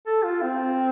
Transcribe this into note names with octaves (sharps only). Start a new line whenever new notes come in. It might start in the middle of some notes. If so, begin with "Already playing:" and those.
A4
F4
C4